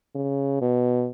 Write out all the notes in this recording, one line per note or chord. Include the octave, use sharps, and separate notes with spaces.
C#3
B2